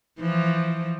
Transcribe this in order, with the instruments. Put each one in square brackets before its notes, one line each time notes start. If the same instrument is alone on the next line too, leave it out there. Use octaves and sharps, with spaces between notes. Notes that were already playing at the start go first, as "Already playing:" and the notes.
[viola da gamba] E3 F3